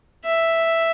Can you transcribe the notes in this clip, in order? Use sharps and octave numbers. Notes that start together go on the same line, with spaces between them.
E5